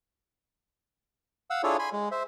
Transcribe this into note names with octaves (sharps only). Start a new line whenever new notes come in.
F5 F#5 E6
D4 E4 F4 G#4 A4 C#5
G#5 B5 C6
G#3
C5 E5